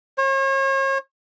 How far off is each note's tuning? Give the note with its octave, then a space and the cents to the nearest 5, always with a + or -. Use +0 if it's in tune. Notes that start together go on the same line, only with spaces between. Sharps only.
C#5 -40